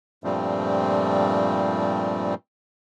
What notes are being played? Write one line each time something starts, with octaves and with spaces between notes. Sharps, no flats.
G2 A#2 F3 G3 A3 C4